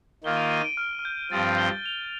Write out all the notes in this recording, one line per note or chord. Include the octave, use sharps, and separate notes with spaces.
D#3 A#3 F4 G7
D#7
D#7
D7
F6
F6
G6
G2 F3 C4 A6
G7
F7